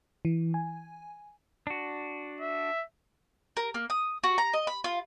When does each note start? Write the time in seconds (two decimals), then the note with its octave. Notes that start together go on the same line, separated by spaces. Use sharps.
0.25 E3
0.54 G#5
1.67 D4 F#4
2.40 E5
3.57 A#4
3.74 A#3
3.90 D#6
4.24 F#4
4.38 A#5
4.53 D#5
4.67 B5
4.84 F4